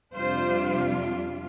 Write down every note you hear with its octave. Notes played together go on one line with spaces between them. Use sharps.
F2 C3 G3 D4 F4 C5